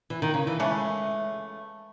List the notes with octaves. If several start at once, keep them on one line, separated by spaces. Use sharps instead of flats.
E3
D#3
C#3
E3
C#3 E3 G#3 A3